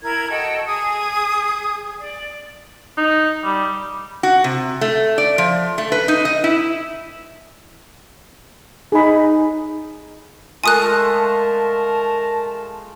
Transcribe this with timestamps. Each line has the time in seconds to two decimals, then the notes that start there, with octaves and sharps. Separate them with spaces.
0.02 E4 A#4 G#6
0.29 F#4 A4 D#5 G5
0.66 G#4 D#6
1.99 D5
2.97 D#4
3.44 G3
4.23 F#4
4.44 C3
4.81 A3
5.18 D5
5.38 F3
5.78 A3
5.92 B4
6.08 D#4
6.25 D#5
6.44 E4
8.92 D#4 G#4 B5
10.64 G#3 A3 F4 A#4 G#5 A5 D#6 F#6